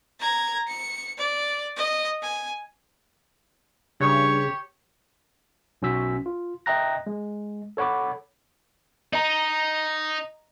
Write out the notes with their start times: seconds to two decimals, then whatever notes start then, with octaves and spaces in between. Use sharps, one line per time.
0.20 A#5 G#6
0.68 C#7
1.18 D5
1.76 D#5
2.22 G#5
4.00 G2 C#3 G4 C#5 C#6
5.82 B1 C#4 F#4 E6 B6
6.26 F4
6.66 D#5 E5 G5 A#5 F#6 A#6
7.07 G#3
7.77 A4 C#5 F#5 B5 D6
9.13 D#4 D#5 A#5